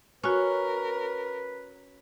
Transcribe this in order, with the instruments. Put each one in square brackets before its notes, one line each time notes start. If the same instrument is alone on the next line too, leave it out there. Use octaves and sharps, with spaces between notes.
[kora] C#4 [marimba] F#4 C#5 [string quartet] A#4 [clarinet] B4